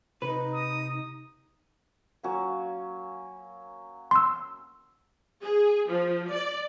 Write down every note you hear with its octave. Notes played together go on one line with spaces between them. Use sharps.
C3 D#4 B4
D#6
F#3 A#3 C#4
C6 E6
G#4
F3
D5